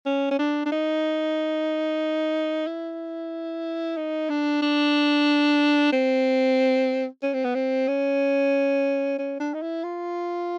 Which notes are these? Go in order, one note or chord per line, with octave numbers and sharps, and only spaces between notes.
C#4
C#4
D4
D4
D#4
E4
D#4
D4
D4
C4
C#4
C4
B3
C4
C#4
C#4
D4
D#4
E4
F4